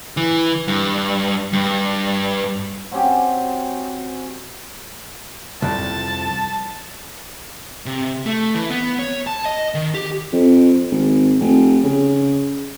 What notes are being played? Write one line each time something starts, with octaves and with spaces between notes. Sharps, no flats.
E3
G2
G2
F#3 C4 C#4 G4
C2 F2 A5
C3
A3
E3
B3
C#5
A5
D#5
D#3
G4
F2
G#1
F1
C#3